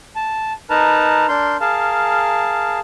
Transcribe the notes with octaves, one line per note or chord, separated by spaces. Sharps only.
A5
D#4 A#4 B4 A5 A#5
D4 A#4 C6 G6
G#4 A#4 F5 A5